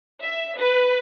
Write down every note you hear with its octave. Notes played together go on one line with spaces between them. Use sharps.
E5
B4